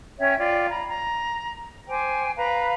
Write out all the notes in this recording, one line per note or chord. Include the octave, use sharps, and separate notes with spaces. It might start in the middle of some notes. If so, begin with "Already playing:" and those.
C#4 C#5 E5 G5
F4 D5 G5
A#5 B5
A#5
C5 G5 G#5 D6
B4 F5 A#5 B5